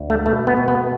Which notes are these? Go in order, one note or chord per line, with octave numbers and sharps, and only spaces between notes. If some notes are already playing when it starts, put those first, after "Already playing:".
Already playing: D2
A3
B2 A3
B3
B2
B3